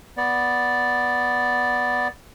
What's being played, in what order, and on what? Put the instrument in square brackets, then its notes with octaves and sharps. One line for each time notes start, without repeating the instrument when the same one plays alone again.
[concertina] B3 D5